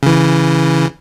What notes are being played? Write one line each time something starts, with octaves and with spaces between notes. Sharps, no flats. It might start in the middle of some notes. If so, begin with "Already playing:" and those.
C#3 E3